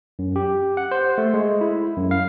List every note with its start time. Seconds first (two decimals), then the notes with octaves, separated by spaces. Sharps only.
0.19 F#2
0.36 G4
0.77 F#5
0.91 C5
1.18 A3
1.34 G#3
1.61 E4
1.97 F#2
2.11 F5